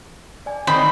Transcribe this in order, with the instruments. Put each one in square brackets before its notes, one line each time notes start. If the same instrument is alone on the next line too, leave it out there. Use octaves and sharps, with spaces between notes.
[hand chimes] D5 G#5
[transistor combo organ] D#3 C4 [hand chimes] C#5 G5 G6 [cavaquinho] B5